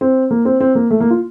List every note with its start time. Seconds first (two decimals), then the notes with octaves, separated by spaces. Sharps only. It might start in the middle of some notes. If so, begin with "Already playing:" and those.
0.01 C4
0.31 A#3
0.45 C4
0.60 C4
0.75 A#3
0.91 A3
1.00 A#3
1.10 F4